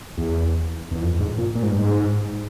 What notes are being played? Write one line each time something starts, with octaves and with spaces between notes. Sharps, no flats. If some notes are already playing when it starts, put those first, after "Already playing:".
E2
E2
F2
G#2
A#2
A#2
G#2
G2
G#2